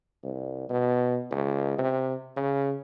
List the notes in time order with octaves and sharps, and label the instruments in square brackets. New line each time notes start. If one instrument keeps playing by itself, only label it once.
[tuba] C2
B2
C#2
C3
C#3